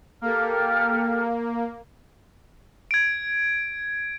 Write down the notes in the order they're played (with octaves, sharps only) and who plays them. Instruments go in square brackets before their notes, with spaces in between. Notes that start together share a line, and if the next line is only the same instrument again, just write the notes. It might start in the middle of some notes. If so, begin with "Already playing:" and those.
[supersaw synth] A#3 [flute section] G4 A4 F6
[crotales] G#6 D7